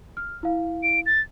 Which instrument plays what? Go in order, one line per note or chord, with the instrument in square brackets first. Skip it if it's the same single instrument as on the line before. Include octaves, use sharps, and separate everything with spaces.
[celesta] F6
E4 F5
[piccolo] D7
A6